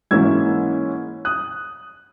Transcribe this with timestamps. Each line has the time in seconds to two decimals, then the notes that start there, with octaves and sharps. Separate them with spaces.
0.11 G#2 E3 A#3 C#4 E4 E6 G#6
1.25 D#6 F#6